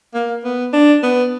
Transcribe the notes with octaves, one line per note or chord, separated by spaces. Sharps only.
A#3
B3
D4
B3